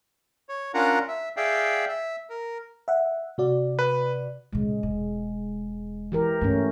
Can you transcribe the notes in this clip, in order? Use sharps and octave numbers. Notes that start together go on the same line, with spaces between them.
C#5
C#4 D4 F4 A#4 F#5 A#5
E5
G#4 D5 E5 F5 G5
E5
A#4
E5 F#5
C3 F#4 D5
B4
A#2 C#3 G#3
E1
E3 G4 A#4
G2 A3 C#4